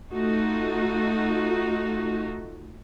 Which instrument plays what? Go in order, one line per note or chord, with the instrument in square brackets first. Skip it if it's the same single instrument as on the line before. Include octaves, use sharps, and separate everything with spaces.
[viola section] A3 D#4 F4 F#4